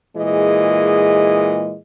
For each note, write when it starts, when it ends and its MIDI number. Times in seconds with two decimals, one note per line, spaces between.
0.16 1.75 46
0.16 1.75 52
0.16 1.75 56
0.16 1.75 68
0.16 1.75 75